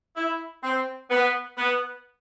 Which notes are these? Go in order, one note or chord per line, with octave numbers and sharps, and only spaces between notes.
E4
C4
B3
B3